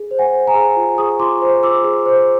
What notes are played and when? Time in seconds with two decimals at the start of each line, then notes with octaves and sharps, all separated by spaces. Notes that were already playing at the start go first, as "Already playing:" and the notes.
Already playing: G#4
0.11 C5
0.19 F#5 G#5
0.33 C5
0.47 G#5 A#5
0.55 G#4
0.76 F4
0.98 G#4 C#6 D#6
1.20 F4 C6 D6
1.41 C5
1.63 F4 D6 E6
1.84 G#4
2.06 C5